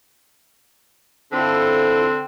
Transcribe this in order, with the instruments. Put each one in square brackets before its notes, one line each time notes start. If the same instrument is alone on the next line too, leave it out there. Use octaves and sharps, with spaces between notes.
[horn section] D3 C4 [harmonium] E4 F4 A4